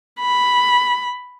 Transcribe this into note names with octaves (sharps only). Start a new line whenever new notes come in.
B5